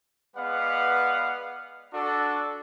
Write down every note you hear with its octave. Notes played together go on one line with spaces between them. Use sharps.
G#3 B3 B4 D5 F5 F#5
D4 F#4 A4